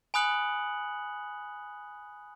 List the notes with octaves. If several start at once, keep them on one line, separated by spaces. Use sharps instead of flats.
G#5 B5 D#6 F#6 C#7 F#7